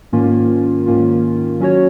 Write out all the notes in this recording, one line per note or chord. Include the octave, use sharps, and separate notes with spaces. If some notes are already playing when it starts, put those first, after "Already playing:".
G#2 D#3 A#3 C#4 F4
G#2 D#3 A#3 C#4 F4
F#3 C#4 F#4 C#5